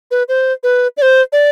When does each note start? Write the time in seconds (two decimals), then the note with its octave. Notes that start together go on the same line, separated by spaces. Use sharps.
0.11 B4
0.28 C5
0.63 B4
0.97 D5
1.02 C5
1.32 D5